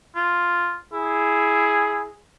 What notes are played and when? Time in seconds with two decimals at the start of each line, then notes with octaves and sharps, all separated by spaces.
0.16 F4
0.93 E4 G#4